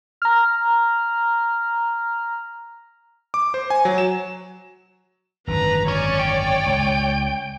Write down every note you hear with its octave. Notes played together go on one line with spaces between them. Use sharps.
A#5 F6
D6
C5
G#5
F#3
E7
G#1 F#2 D3 B4 A#5
C#4 C#5 D5
G5
C#2